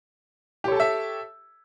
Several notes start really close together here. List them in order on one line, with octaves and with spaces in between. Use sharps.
G4 C#5 A4 A5 E5